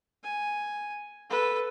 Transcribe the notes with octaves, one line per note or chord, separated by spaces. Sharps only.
G#5
A4 B4